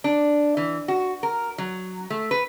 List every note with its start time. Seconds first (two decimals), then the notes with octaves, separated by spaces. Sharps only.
0.04 D4
0.57 E3
0.88 F#4
1.23 A#4
1.58 F#3
2.10 A3
2.31 B4